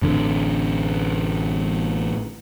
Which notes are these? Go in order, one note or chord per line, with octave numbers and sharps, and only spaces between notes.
A1 D3